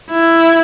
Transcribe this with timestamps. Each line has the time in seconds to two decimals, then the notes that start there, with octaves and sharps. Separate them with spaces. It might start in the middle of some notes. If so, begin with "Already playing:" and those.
0.10 E4